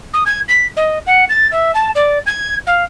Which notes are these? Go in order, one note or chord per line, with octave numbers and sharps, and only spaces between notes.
D#6
G#6
B6
D#5
F#5
A6
E5
A5
D5
G#6
F5